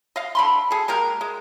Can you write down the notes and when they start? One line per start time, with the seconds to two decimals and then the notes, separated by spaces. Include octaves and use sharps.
0.16 D#5 F5
0.35 D3 B5 C6
0.71 G#4 A4
0.88 G#3 A#3 G4 A#4
1.21 G#3